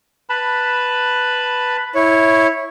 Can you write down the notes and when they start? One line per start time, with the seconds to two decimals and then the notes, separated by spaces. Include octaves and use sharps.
0.30 B4 A5 B5
1.95 E4 C#5